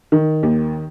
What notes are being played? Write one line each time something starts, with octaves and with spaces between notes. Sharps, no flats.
D#3
D#2